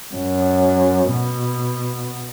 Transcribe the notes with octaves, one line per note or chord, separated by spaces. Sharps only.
F#2
B2